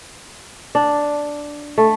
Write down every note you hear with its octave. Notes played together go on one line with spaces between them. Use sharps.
D4
A3